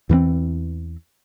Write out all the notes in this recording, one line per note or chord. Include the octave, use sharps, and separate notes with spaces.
E2 E3 F3 C4